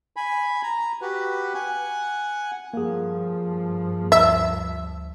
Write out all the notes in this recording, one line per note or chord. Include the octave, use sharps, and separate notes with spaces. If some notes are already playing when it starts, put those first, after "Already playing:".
G#5 B5
A#5
F#4 G4 B4
F#5 G#5
G2 F3 A#3 G#4
D2 E5